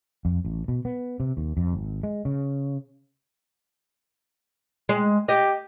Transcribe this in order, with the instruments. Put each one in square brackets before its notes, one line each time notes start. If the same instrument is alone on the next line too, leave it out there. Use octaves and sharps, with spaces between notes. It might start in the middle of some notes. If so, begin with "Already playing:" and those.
[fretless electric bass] F2
A1
B2
B3
C3
D#2
F2
G#1
G#3
C#3
[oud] G#3
[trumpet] G4 [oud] D#5